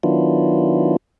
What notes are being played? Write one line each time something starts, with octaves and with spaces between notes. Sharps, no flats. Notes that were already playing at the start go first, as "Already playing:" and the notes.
D#3 F#3 B3 D4 E4 F4